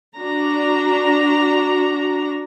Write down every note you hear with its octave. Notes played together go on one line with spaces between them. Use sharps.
D4 F#4 A#5